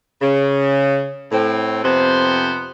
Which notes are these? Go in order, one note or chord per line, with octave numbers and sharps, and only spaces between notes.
C#3
A2 C4
F2 C3 B3 C5